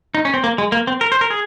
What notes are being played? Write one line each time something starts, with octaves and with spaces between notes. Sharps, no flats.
D#4
C#4
C4
A#3
G#3
A#3
C4
A#4
C5
A#4
G#4